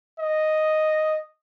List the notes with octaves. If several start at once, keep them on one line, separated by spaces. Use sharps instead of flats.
D#5